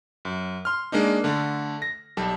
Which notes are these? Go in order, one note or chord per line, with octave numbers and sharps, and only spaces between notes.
F#2
C6 F6
G#3 A#3 D4 D#4
D3 A3
A#6
B1 G3 A4